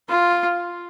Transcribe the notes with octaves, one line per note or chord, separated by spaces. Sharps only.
F4